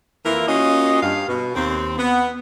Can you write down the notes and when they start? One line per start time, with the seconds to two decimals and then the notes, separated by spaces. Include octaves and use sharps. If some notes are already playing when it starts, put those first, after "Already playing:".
0.24 F2 E3 A#3 E4 F4 A#4
0.47 A#3 C#4 F4 F#4 D#5
1.02 G2 F5
1.27 B2
1.55 D#2 C4
1.98 B3